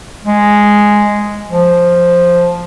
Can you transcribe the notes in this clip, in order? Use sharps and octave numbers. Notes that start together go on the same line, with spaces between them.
G#3
F3